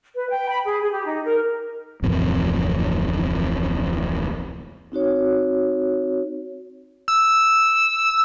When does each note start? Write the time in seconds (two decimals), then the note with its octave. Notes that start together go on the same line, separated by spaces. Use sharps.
0.15 B4
0.29 G5
0.49 B5
0.66 G#4
0.80 G#4
0.92 G4
1.05 D#4
1.25 A#4
2.02 D1 A1 F2 C3
4.92 C4 D#4 F#4 C#5
7.08 E6